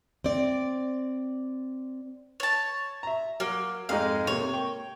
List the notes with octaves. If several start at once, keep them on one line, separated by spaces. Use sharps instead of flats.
C4 D5
C#5 A5
E5 A#5
F#3 A#3
F2 G#2 G#3 F5
C3 A#3 C#5
G5 C#6